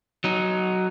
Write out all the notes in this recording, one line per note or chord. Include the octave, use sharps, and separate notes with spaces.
F#3 D#4